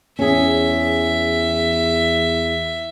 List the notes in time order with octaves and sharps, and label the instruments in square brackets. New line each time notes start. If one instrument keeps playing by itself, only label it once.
[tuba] E2 [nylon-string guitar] C#4 G#4 [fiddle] E5